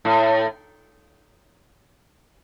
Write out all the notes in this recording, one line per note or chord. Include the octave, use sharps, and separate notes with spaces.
A2